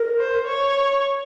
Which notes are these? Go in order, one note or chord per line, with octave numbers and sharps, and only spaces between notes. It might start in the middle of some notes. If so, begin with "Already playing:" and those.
Already playing: A#4
C5
C#5